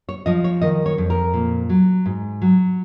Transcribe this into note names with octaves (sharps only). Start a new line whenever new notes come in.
C#5
F3 D#5
C#5
D#3 D#5
C#5
F2
A#4
A#2
F#3
G#2
F#3